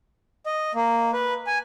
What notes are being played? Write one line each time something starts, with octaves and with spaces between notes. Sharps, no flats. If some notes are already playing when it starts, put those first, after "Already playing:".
D#5
A#3
B4
G#5